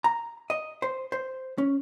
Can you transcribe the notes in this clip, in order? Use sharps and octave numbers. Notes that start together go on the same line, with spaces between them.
A#5
D#5
C5
C5
C#4